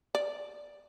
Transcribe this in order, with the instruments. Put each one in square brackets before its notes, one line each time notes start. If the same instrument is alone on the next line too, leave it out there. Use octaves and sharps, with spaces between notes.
[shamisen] D5